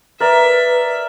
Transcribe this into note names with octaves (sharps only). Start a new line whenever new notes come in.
A#4 B4 D5 E5